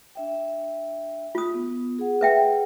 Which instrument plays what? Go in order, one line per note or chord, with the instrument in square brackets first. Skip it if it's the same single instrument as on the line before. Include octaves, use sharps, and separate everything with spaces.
[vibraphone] D4 E5 G5
[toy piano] F4 D#6
[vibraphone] B3
G#4 F#5
[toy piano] B4 E5 G5